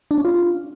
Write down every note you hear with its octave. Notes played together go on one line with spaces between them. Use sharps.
D4
C#4
F4